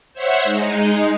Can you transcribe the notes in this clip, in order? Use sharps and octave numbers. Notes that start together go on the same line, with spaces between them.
C5 C#5 E5 F#5
G#3 D#4